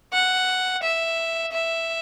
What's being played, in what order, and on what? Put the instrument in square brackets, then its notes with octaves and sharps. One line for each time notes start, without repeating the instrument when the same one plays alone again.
[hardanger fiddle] F#5
E5
E5